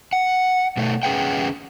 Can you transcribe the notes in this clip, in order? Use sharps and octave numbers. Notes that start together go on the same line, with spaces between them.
F#5
B2 A3
E2 C#4 G#4 B4 F#5 G5